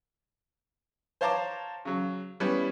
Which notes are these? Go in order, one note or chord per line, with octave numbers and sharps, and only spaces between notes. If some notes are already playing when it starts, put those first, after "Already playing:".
C5 C#5 F5 A5 A#5 D6
C#3 F#3
G3 B3 C#4 E4 B4